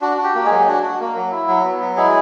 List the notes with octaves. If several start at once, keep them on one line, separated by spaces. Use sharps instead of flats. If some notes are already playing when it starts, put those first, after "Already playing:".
D4 F#4
F#4
G4
A#3
G#3 G#4
F#3
D4 F#4
F#4
A#3
F#3
E4
F#3
B3
F#3
G#3 E4 G#4